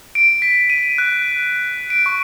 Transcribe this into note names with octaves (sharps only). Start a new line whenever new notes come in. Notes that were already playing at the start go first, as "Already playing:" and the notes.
D7
B6
D#7
F#6
D7
C#6